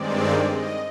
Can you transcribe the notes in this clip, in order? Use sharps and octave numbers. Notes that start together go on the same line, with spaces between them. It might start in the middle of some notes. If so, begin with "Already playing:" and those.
Already playing: G2 D#3 G#3 C4 D5
D#5